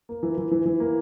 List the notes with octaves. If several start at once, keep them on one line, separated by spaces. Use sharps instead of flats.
A#3
E3
E3
E3
E3
A#3